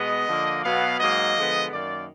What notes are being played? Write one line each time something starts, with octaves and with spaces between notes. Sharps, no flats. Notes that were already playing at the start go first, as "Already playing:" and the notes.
Already playing: B2 G#3 B3 D#5
D3 F3 A#3
B2 F#3 B3 F5
G#2 F#3 A#3 D#5
D3 F3 G#3 B3
F#2 D#3 A#3 D5